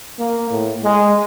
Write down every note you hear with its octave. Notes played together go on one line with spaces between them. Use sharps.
A#3
A2
G#3